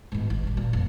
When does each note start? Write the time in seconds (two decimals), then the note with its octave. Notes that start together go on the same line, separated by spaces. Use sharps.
0.12 G#2 B2
0.30 G#1
0.43 G2 B2
0.57 A#2
0.73 F1